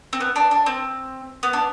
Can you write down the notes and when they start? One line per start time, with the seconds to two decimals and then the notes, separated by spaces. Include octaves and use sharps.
0.13 C4
0.21 B3
0.36 D4
0.51 D4
0.66 C4
1.43 B3
1.53 D4